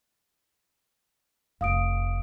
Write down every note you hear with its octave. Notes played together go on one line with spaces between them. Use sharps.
F1 F5 D#6 D7